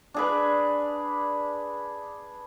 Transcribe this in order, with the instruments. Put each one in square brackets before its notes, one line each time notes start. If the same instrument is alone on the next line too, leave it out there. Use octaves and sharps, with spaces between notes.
[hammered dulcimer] D4 G#4 B4